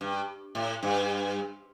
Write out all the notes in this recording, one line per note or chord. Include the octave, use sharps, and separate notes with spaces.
G2
A2
G2